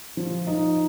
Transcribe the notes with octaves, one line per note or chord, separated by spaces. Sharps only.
F3
D#4